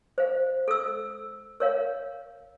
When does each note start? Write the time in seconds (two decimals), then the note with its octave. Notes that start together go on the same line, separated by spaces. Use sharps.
0.18 C5 F5
0.68 A4 E6
1.60 A#4 C#5 F5